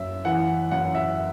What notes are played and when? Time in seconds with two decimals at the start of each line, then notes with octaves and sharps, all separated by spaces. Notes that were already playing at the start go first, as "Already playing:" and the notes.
Already playing: F#2 E5
0.25 E3 F#5
0.71 F#2 F#5
0.95 E5